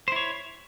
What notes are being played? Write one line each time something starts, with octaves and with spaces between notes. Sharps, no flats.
E4 C5 C#5